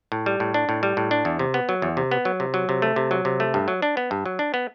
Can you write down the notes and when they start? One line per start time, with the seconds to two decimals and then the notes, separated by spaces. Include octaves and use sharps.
0.12 A2
0.26 G3
0.40 A2
0.54 D4
0.69 A2
0.83 G3
0.97 A2
1.11 D4
1.25 E2
1.39 C3
1.54 B3
1.69 F#3
1.82 E2
1.97 C3
2.11 B3
2.25 F#3
2.40 C3
2.54 F#3
2.69 C3
2.82 A3
2.96 C3
3.11 F#3
3.25 C3
3.40 A3
3.54 G2
3.68 F#3
3.82 D4
3.97 B3
4.11 G2
4.26 F#3
4.39 D4
4.54 B3